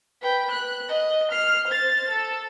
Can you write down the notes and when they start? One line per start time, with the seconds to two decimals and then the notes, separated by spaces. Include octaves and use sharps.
0.22 B4 G5
0.51 F#6
0.88 D#5
1.31 F6 C7
1.68 C5 A6
2.10 A4